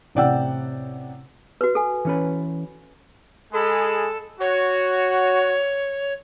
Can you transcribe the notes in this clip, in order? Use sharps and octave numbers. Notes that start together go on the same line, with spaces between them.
A1 C3 D5 F#5 G5 E6
F#4 B4
A4 G#5
E3 C#4 B4
G#3 G#4 A4 B5
F#4 C#5